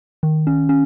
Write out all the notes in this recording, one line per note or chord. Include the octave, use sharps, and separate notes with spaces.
D#3
C#4
C#4